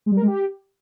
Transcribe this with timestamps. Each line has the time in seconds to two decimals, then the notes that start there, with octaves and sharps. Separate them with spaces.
0.06 G#3
0.11 G3
0.17 A#4
0.22 G#3
0.27 G4